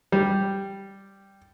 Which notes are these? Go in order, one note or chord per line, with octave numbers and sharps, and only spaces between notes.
G3